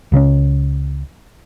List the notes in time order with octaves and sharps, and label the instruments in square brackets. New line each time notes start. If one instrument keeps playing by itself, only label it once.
[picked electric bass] C#2 C#3 C4 C#4